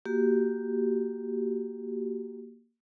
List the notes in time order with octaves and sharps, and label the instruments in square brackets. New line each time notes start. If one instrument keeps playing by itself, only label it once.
[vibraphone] A#3 F#4 G4